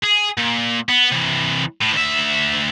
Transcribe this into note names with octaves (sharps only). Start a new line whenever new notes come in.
G#4
A#2
B3
C3 E3
A2
D2 E5